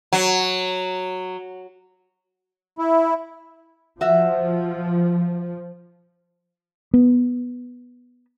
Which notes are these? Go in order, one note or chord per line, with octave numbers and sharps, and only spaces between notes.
F#3
E4
F3 F#4 E5
B3